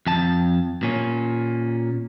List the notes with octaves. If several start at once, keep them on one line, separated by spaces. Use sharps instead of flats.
F2 A5
A#2 C#4